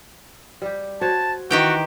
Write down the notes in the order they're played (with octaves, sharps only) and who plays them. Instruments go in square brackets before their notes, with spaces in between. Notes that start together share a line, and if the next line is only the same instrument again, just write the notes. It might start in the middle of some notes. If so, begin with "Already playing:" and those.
[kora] G3 G4
[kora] F#4 C5 C#5 [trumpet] A5
[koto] D#3 G4 G5 [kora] E3 [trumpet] F#4